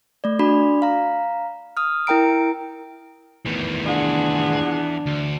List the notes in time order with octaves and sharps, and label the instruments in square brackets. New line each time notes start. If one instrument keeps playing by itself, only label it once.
[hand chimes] A3 D5
D4 F#4 D5 B5
F5 A#5
D#6 F6
E4 A#4 G5 A#5 D7
[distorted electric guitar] A2 D#3 [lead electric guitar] E3 B3
[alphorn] D4 [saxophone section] F4 G#4 F#5
[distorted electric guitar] D2